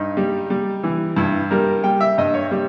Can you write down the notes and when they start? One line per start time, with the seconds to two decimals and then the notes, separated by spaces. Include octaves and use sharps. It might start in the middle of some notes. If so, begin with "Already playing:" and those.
Already playing: G2 D#4
0.17 G3
0.50 G3
0.83 E3
1.17 G2 E4
1.51 G3 A#4
1.84 G3 G5
2.01 E5
2.18 G2 D#5
2.34 C#5
2.51 G3